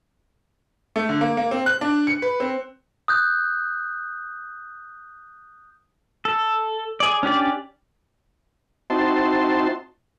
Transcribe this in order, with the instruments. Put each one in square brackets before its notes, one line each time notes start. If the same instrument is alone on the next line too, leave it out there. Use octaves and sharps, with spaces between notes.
[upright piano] A3
D3
A#3
A#3
C4
F#6
D4
C#7
B4
C4
[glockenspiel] D#6 F#6 G6
[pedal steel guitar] A4
G#4 D5
C#4 D4 G4 D5
[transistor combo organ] C4 D#4 E4 F#4 A5 C6